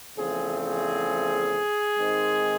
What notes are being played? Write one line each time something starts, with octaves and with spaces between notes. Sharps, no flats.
E2 C#3 F3 A3 C4 G#4
G#4
G#2 D#3 G#3 C4